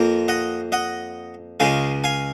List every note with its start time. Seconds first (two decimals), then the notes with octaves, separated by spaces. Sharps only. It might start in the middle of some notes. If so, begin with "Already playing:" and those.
Already playing: F2 F3 A#3
0.28 D#5 F#5
0.72 D#5 F#5
1.60 C#2 C#3 G#3 F5 G#5
2.04 F5 G#5